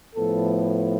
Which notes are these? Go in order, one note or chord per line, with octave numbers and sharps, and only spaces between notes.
A2 F3 B3 A4